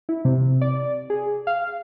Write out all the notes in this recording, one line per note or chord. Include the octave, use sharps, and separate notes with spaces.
E4
C3
D5
G#4
F5